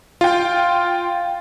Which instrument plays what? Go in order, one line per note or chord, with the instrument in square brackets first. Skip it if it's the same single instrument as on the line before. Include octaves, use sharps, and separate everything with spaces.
[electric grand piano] F4 G5